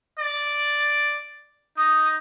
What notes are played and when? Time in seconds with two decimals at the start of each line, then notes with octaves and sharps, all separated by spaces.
0.19 D5
1.78 D#4 D#6